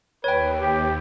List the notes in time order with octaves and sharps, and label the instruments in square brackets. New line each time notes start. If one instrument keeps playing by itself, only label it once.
[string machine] D#2 [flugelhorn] B4 [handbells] C#5 G5
[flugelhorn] G4